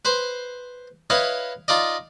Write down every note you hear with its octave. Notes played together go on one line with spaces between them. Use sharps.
B4 C5 C6
E4 B4 C#5 D#5 F5
D#4 F4 D5 D#5